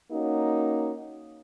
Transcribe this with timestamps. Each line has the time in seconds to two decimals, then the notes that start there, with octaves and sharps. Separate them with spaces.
0.11 A#3 C#4 D#4 F#4